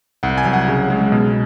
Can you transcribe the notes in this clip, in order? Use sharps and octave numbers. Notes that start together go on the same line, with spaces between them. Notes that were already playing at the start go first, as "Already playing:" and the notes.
C2 F#5
G#5
F#3
F#5
C#3
G#3
B2